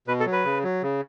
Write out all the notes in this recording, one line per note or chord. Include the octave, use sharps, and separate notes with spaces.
B2 B4
A4
F#3
B4
C#3
F#3
C#3